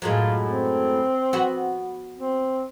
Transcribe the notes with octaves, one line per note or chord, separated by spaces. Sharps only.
F#2 A2 G#3 F4
C4
B3 F#4
C4